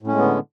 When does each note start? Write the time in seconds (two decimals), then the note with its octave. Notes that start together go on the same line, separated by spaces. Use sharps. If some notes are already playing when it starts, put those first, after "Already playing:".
0.02 A2
0.07 C#4
0.12 G#3
0.17 B3
0.22 D3